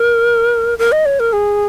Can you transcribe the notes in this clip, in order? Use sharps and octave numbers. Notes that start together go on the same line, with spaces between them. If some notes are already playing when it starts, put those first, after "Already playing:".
Already playing: A#4
A#4
D#5
C#5
A#4
G#4